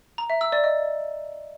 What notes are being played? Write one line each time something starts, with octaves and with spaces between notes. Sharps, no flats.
A#5
E5
E6
D5
D#5